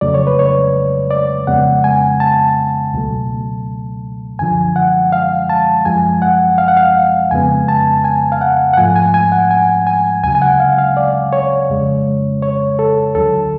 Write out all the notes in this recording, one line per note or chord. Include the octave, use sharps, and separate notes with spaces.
F2 C#3 F#3 A3 D5
C#5
B4
C#5
D5
F2 C#3 G#3 B3 F#5
G#5
A5
C#2 B2 F#3 A3
F#2 D3 F3 G#5
F#5
F5
A5
F#2 F3 G#3 G#5
F#5
F5
F#5
F5
F2 C#3 G#3 B3 G#5
A5
G#5
F5
F#5
F#5
G#2 F3 A3 G#5
G#5
G#5
F#5
G#5
G#5
D2 C#3 F#3 G#5
G#5
F#5
F5
F5
D5
C#5
F2 C#3 G#3
C#5
A4
D2 D3 F#3 A4